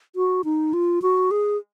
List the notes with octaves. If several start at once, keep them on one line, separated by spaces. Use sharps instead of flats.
F#4
D#4
F4
F#4
G#4